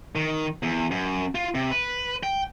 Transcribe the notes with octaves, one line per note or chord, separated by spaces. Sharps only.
D#3
E2
F#2
F4
C3
B4
G5